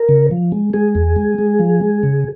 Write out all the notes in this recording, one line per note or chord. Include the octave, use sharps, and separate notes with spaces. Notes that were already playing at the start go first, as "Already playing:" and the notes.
Already playing: A#4
C#3
F3
G#3
G#3 G#4
E2
G#3
G#3
F3
G#3
C#3